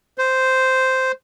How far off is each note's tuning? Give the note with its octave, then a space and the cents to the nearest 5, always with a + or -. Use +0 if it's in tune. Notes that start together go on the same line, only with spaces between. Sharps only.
C5 -5